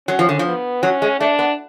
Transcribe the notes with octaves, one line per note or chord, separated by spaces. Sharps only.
F#3 C#4
F3
D3
F3
B3
F#3 C#4
G#3
A3 D4
B3